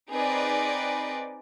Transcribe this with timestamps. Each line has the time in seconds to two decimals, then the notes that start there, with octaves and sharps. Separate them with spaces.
0.11 C4 D#4 G#4 B4 D5